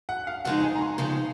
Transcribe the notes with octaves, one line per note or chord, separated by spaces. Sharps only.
F#5
F5
F2 C#3 F3 G#3 D#4 F#5
G#5
A#5
C6
F2 C#3 F3 G#3 D#4